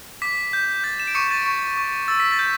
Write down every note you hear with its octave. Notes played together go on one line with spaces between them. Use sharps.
D6 B6
G6
G6 A6
E7
D7
C#6 D6 C#7
A6
C#6
C#6
E6 A6
B6
A6
G6